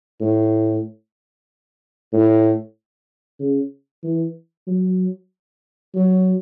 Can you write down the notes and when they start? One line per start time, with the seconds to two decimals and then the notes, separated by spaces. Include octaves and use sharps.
0.21 A2
2.13 A2
3.39 C#3
4.03 E3
4.67 F#3
5.94 F#3